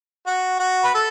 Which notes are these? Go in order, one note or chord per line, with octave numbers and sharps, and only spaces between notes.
F#4
F#4
B4
A4